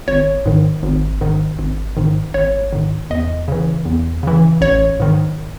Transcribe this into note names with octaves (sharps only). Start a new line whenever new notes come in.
G#1 C#5
G#2 D#3
G#1
G#2 D#3
G#1
G#2 D#3
G#1 C#5
G#2 D#3
E2 D#5
C#3 E3
E2
C#3 E3
A1 C#5
G#2 D#3